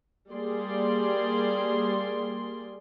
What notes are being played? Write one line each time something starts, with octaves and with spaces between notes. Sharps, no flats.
G3 A#3 G#4 D5 C6